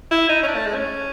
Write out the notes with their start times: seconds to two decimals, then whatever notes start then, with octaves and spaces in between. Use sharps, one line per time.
0.11 E4
0.29 D#4
0.43 C#4
0.47 D4
0.55 A3
0.66 G#3
0.74 C#4